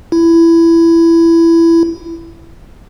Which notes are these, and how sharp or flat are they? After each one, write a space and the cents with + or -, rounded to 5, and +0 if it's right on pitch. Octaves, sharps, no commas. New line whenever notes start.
E4 +15